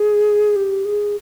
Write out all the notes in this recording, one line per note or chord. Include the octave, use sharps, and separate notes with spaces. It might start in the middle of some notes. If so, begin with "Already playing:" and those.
Already playing: G#4
G4
G#4